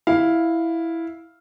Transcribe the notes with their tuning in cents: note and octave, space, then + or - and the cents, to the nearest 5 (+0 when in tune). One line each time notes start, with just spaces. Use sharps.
E4 +0 F5 +0